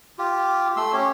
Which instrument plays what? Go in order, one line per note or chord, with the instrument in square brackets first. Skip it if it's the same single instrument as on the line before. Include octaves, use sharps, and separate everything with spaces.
[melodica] F4 G4
A3 C6 E6
C#4 G4 C#5